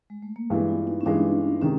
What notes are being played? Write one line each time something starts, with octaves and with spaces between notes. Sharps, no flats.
G#3
A3
A#3
G2 E3 G#3 B3
F4
D#4
C#4
G2 E3 G#3 D4
C3 D#3 G#3 C#4